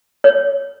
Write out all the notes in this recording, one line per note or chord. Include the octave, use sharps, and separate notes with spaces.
C#5